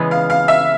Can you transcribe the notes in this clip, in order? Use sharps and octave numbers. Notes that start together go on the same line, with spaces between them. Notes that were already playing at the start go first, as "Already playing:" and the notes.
Already playing: C#3 E3 G#3 B3
F5
F5
E5